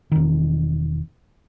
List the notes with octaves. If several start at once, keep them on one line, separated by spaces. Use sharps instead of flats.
E1 D#3